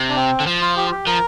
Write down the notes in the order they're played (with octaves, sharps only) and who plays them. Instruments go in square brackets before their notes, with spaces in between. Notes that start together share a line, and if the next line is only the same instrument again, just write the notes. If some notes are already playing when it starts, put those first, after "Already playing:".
Already playing: [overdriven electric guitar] C3
[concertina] D4
C4
[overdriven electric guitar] D3
F3
[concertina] F4
G4
F4
G4
[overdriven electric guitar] F3 [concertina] A#4